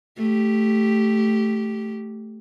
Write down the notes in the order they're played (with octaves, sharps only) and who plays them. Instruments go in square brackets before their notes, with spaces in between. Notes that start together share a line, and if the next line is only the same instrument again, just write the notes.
[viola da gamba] A3 G4